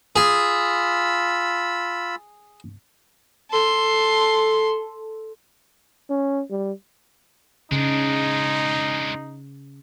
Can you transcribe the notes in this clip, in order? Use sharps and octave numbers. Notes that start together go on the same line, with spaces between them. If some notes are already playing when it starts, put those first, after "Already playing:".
F4 G#4 B5 E6
A4 C6
C#4
G3
C#3 G#3 D4 D#4